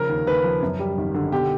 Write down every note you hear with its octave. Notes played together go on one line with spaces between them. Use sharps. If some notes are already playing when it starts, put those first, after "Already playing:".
Already playing: C#3 F3 A#4
D#2
D#2 B4
F3
F#2
G3
G#1
D3
B2 G4